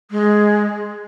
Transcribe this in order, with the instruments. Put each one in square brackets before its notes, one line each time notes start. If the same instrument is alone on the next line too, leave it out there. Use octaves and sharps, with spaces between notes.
[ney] G#3